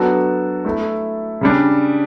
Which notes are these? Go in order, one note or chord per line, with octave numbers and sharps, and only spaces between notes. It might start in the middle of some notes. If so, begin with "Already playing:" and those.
Already playing: F#3 B3 D4 F#4 A4
A3 E4 A4
C#3 G3 D4